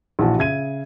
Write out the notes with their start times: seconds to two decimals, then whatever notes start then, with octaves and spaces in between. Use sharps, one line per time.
0.19 A#1 E3 F#4 A5
0.38 C#3 E5 G#6 D#7